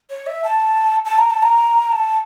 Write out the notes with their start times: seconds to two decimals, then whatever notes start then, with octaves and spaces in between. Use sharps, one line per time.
0.10 C#5
0.27 E5
0.44 A5
1.05 A5
1.18 A#5
1.30 A5
1.43 A#5
1.92 A5